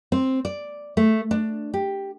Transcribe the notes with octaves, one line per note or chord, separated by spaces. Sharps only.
C4
D5
A3
D4
G4